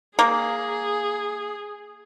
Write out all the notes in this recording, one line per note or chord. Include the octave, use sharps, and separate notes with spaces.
A#3 G#4